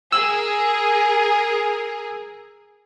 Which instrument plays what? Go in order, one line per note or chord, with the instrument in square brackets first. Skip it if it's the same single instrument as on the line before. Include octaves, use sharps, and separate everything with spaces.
[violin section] G#4 A#4 [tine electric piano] E6